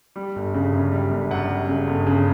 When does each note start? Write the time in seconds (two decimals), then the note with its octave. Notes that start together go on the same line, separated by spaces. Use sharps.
0.16 G3
0.36 G1
0.54 C#3
0.73 F#2
0.92 G3
1.11 G1
1.31 F#2 F#5
1.50 G3
1.68 C#3
1.87 G1
2.07 C#3